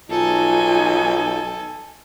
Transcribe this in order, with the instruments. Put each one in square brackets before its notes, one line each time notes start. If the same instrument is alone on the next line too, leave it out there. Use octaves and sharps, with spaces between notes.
[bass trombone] B1 [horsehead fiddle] D#4 G#5 [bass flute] F4 [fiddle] A4